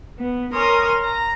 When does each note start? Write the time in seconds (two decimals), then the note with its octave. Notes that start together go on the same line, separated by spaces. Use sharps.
0.19 B3
0.53 A#4 C#5 G#5 C6 D#6 F6
1.02 A#5